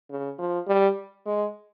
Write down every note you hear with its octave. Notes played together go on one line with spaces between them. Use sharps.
C#3
F3
G3
G#3